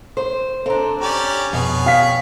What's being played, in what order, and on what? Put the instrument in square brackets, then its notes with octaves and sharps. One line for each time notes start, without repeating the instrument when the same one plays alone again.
[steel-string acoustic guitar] C5
[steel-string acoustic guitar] C4 D4 [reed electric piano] A4 C5 A#5
[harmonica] C#4 G4 D5 [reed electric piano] A#5
[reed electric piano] F2 [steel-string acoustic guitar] B2 [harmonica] G#4 B4 C#5
[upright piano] F5 B6 [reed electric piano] G5